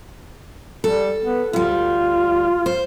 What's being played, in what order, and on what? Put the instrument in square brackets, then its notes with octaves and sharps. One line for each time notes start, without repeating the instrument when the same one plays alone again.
[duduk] G3 [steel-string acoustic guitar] A4
[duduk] B3
[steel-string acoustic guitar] D2 G3 [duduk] F4
[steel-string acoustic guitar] C5